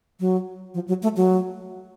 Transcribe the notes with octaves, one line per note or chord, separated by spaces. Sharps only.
F#3
F3
F#3
A3
F#3